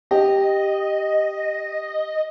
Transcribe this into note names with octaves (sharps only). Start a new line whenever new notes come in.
G4 D#5